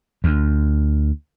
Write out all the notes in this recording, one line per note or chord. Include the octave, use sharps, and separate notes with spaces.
D2